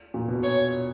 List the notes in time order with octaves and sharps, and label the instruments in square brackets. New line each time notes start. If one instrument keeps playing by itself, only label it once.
[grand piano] A#2
B2
[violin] C#5